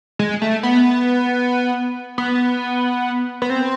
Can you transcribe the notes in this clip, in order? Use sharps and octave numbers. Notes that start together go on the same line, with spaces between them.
G#3
A3
B3
B3
B3
C4